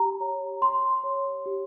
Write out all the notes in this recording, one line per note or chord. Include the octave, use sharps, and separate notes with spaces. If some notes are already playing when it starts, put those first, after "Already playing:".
Already playing: G4 A#5
C#5
G4 C6
C#5
G4